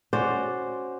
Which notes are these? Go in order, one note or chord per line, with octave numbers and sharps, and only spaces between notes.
C#4 F#4 C5 D5